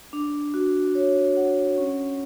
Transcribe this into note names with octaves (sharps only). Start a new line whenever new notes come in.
D4
F#4
C#5
F#5
C#4